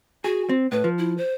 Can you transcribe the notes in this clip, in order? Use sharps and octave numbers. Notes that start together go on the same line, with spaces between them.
F#4 G#4
C4
A2 B4
F3
E4
C5